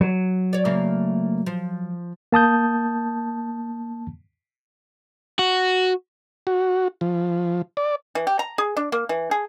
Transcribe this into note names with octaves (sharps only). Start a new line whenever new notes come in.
F#3
C#5 D5
C#3 A3 A#3
F3
A#3 A5 D#6 G6
F#4
F#4
F3
D5
E3
G4
A#5
G#4
D4
A#3
E3
G#4